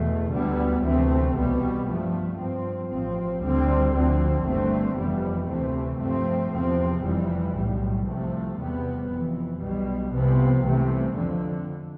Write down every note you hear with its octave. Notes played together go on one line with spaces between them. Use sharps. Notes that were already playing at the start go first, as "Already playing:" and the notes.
Already playing: E2 B2 A3
D2 D3 G3 B3
D2 C3 E3 A3 C4
C2 B2 G3 B3
G2 F3 A3
G2 F3 C4
A1 A2 F3 C4
D2 D3 G3 C4
D2 D3 F3 C4
G1 G2 D3 A3 C4
F1 F2 E3 G3 B3
D2 C3 E3 A3 C4
G2 F3 A3 C4
E2 C3 F3 C4
F1 F2 E3 G3
B1 A2 G3
C2 C3 F3 A3
E2 C3 G3 B3
F1 F2 E3
B1 B2 G3
C2 C3 F3 B3
C2 C3 E3 A3
F2 D3 F3